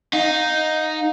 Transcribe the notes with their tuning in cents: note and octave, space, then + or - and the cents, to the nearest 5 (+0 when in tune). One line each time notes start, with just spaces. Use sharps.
D#4 +0 F5 +30